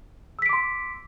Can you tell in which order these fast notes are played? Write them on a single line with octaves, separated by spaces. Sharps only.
E6 B6 D7 D6 C6